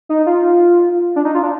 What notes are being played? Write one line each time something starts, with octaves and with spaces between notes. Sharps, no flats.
D#4
F4
D4
D#4
F4
D4